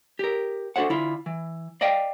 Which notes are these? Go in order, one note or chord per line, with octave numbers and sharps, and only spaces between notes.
G4 A#4
D4 F#4 A4 C5 F#5
D3 E4 F4
E3
D5 D#5 F5 G5